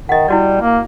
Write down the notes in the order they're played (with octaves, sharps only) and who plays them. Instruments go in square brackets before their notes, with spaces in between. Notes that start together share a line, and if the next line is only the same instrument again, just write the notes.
[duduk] D#3 [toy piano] D#5 F#5
[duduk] G3 [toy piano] E4 F#4 D5
[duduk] A#3